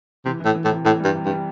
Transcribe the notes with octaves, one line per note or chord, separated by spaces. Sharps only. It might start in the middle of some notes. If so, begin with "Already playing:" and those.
C3 E3
A2 E3
E3
A2
C3
A2 E3
G2 G3
C3
G2
G3